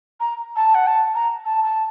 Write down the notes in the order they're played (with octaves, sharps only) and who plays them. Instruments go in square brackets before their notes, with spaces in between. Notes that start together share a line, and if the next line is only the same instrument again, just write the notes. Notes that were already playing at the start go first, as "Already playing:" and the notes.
[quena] A#5
A5
F#5
A5
A#5
A5
A5